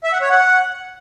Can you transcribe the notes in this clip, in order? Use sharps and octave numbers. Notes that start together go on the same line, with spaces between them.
E5
F#5
C#5
F#5